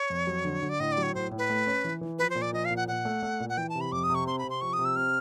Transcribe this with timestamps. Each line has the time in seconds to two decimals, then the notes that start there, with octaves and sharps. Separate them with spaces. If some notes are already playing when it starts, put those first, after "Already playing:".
Already playing: C#5
0.10 F2
0.27 F#3
0.45 D3
0.62 D3
0.69 D5
0.80 A2 D#5
0.92 D5
0.98 F#3
1.03 C#5
1.15 A2 C5
1.31 A2
1.38 B4
1.50 A3
1.67 C#4
1.84 E3
2.01 E3
2.19 F3 B4
2.30 C5
2.35 A#2
2.42 D5
2.53 F3 D#5
2.65 F5
2.71 A#2
2.76 F#5
2.88 A#2 F#5
3.05 A3
3.23 A3
3.40 A#2
3.49 F#5
3.57 E3 G5
3.69 A5
3.75 C3
3.81 B5
3.92 F2 D6
4.03 D#6
4.10 C3
4.15 C#6
4.27 C4 C6
4.39 B5
4.44 C3
4.50 C6
4.61 F3 C#6
4.73 D#6
4.79 C3
4.85 E6
4.96 C4 F6